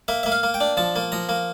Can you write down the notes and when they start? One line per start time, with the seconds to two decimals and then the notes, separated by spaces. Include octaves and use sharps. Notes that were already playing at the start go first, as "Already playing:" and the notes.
0.08 A#3 E5
0.23 A#3 E5
0.32 F5
0.43 A#3
0.54 G5
0.61 D4
0.77 F3 A5
0.96 A#3
1.12 F3 A#5
1.29 A#3